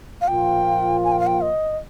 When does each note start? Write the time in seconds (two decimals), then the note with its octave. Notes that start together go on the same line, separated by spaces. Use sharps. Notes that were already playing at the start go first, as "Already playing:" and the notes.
0.21 F5
0.28 A#2 F3 A#3 F4 G5
1.04 G#5
1.12 G5
1.20 F5
1.27 G5
1.42 D#5